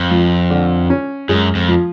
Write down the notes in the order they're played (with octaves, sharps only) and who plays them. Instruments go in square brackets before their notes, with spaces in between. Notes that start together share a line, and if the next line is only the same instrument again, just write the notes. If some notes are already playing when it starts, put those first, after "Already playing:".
Already playing: [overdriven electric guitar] F2
[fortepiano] F3
D3
C#4
[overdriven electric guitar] F#2 [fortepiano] G#3
[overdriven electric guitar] F2
[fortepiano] F3